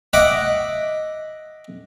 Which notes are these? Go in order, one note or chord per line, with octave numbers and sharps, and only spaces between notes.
D#5 E5 F#5 D6